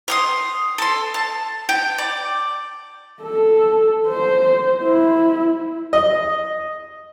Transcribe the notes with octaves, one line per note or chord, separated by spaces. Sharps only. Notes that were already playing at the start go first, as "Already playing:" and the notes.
C6 D#6 F6
A4 C6
A5
G5
D5
A4
C5
E4
D#5